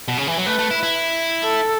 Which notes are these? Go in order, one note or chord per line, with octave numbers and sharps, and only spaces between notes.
B2
C#3
E3
F#3
A3 B4
A3
E4
E4
A4